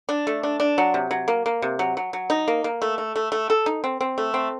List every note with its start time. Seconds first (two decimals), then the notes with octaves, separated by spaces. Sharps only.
0.09 D4
0.27 A3
0.43 D4
0.60 D4
0.78 F#3
0.94 C3
1.11 F#3
1.28 A#3
1.46 A#3
1.62 C3
1.79 F#3
1.97 F#3
2.13 F#3
2.30 D#4
2.48 A#3
2.64 A#3
2.82 A3
2.98 A3
3.16 A3
3.32 A3
3.50 A4
3.66 D#4
3.84 C4
4.01 C4
4.18 A3
4.34 C4